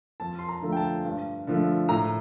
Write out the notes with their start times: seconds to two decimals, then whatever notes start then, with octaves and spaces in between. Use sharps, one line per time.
0.20 F2 A5
0.39 C6
0.49 A#5
0.62 D3 F3 A3
0.72 G5
0.77 A5
1.04 G2
1.47 D3 F3 A3
1.89 A2 A#5